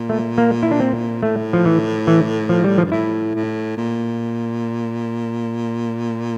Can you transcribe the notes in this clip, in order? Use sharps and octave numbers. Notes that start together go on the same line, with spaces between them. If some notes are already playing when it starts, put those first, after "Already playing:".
Already playing: A#2
A3
A#3
E4
D4
C4
A2 A3
F3
E3
E3
F3
G3
F3
G2
A2 E4
A2
A#2